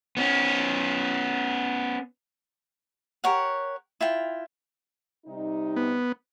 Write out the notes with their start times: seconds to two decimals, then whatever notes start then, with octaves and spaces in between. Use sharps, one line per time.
0.17 B3 C#4
3.24 G4 A#4 C#5 F#5
4.01 E4 F4 G5
5.26 C3 G3 D#4
5.76 B3